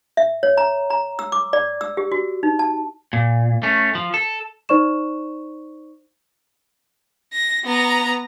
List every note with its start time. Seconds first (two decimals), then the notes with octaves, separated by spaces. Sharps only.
0.17 E5
0.43 C#5
0.57 A#5
0.90 A#5
1.19 E6
1.32 D6
1.53 D5
1.81 E6
1.97 G4
2.12 F#4
2.43 D#4
2.59 A5
3.13 A#2
3.63 A3 C#4
3.95 F3
4.14 A4
4.69 D#4 C5 D5 C#6 E7
7.33 A#6
7.64 B3 A#5